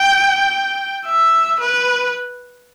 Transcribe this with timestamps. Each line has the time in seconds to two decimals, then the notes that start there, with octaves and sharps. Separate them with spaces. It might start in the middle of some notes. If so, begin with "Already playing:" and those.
Already playing: G5
1.06 E5
1.60 B4